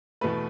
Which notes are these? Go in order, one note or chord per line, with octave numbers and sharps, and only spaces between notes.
E2 B2 A3 B4